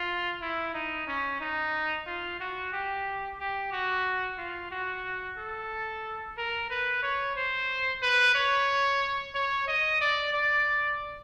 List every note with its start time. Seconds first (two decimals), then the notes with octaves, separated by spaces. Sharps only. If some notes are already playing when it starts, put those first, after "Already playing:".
Already playing: F4
0.41 E4
0.74 D#4
1.07 C#4
1.40 D#4
2.07 F4
2.40 F#4
2.72 G4
3.39 G4
3.72 F#4
4.38 F4
4.71 F#4
5.38 A4
6.37 A#4
6.70 B4
7.02 C#5
7.36 C5
8.02 B4
8.35 C#5
9.35 C#5
9.68 D#5
10.01 D5
10.34 D5